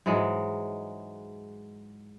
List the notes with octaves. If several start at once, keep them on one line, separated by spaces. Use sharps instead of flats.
G#2 E3 F#3 G#3